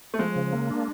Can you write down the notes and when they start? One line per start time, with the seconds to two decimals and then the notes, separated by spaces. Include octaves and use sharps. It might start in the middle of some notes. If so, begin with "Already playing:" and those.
0.14 A3
0.19 F3 G#3
0.36 C#3
0.53 A#3
0.69 D4